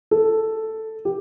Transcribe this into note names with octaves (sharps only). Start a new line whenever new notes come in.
A4
G4